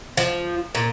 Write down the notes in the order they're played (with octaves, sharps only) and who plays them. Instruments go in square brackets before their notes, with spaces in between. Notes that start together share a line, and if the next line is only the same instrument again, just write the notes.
[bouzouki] F3
A#2